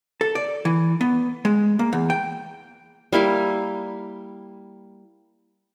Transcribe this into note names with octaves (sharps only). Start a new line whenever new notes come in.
A4
D5
E3
B3
G#3
A#3
E2
G5
G3 A#3 E4 F5